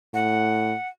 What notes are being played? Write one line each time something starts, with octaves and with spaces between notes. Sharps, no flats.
A2 F#5